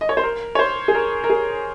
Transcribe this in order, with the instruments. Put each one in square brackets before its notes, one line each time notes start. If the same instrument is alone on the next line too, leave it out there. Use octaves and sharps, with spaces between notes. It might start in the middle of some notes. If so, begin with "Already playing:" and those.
[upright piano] D#5
C#5
C5
A#4
C#5
C5
G#4
A#4
A#4
G#4